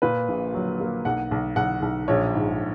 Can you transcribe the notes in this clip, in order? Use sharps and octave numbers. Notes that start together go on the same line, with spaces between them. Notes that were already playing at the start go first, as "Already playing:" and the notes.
A#2 B4
A#1
F#3
A#3
B1 F#5
B1
B1 F#5
B1
A#1 C#5
G#2